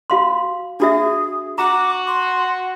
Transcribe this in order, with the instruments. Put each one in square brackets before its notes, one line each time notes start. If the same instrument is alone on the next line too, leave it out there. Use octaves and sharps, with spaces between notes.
[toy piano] F#4 F5 C6
[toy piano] D4 F#4 E5 [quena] G#4
[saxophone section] F#4 [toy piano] A#5 [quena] D6
[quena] C6